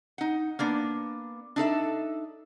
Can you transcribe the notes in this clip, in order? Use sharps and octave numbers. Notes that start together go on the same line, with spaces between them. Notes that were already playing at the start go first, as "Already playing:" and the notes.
D#4 F#5
A#3 B3 D4
D4 D#4 A4 E5